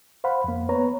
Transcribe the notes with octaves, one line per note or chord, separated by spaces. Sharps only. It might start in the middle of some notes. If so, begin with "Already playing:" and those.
C5 F5 F#5 B5
F2 A#3
B3 B4 C#5 A#5